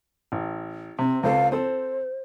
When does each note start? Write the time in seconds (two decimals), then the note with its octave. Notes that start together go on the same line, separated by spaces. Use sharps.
0.32 A1
0.99 C3 C4
1.23 C#2 C4 A4 F5
1.52 C4 A4 C5